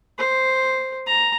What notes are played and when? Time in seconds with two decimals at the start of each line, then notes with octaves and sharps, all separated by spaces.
0.19 C5
1.07 A#5